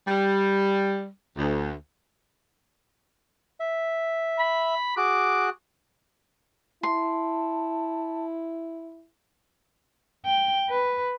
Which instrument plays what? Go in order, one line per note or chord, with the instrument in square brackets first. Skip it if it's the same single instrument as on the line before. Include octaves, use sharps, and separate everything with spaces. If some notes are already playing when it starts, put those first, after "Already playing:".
[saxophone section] G3
D2
[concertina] E5
[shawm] B5
[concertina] F#4 G#4 F#6 [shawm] D6
[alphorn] E4 [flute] A5 [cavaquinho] C6
[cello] G5
B4